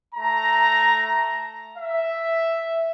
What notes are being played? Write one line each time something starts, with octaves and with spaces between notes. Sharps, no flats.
A3 A#5
E5